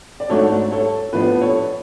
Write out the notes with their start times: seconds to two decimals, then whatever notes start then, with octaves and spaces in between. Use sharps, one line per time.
0.20 D5
0.30 G#2 F#3 A3 D4 A4 C#5
0.71 A4 C#5
1.13 A2 F3 B3 D4 B4
1.41 A4 C#5